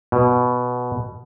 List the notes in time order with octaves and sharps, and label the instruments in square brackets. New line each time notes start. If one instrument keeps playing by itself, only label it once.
[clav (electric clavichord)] B2